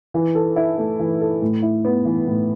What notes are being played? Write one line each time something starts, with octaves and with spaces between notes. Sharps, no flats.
E3
A4
E4
A3
E3
A4
A2
E4
B3
E3
A2